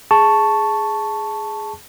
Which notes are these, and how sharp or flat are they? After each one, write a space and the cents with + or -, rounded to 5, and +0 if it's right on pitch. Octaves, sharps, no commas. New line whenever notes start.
G#4 +0 A5 +0 C#6 +0